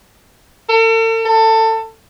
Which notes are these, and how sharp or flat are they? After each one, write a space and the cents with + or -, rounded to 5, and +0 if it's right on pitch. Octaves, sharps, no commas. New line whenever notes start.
A4 +45
A4 +25